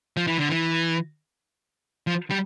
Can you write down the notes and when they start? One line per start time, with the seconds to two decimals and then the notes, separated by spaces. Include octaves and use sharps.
0.17 F3
0.27 E3
0.38 D3
0.49 E3
2.07 F3
2.30 G3